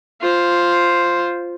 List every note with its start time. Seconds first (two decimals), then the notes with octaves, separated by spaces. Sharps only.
0.21 F4 C5